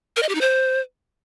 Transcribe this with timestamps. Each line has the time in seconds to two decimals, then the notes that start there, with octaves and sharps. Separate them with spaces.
0.16 A#4
0.23 D#5
0.29 G4
0.35 D#4
0.41 C5